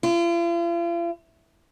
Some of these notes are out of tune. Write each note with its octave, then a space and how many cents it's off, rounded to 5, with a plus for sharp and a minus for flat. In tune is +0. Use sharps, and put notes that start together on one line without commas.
F4 -45